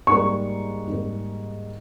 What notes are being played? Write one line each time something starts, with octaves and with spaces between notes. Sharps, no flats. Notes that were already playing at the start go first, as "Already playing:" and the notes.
G#2 G3 A#3 C#6
G#2 G3 A#3